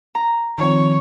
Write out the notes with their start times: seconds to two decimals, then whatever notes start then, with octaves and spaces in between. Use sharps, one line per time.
0.15 A#5
0.58 D#3 F3 C4 C#5